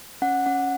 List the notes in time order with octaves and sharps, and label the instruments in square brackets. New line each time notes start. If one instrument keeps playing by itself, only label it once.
[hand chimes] C#4 F#5
C#4 F#5